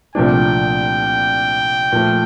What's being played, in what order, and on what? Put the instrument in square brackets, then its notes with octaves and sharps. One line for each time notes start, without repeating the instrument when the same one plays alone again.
[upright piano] C2 A#2 F3 A3 D4 [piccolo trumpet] G5
[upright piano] A#2 F3 A3